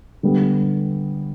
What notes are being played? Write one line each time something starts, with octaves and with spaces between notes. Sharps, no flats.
D3 G3 B3